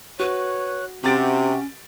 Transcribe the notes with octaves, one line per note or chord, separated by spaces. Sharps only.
F#4 B4 C#5 F#6
C3 C#4 F#4 G4 A6 D7